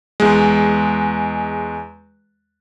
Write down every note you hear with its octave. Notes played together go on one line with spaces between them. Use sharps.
E2 G#3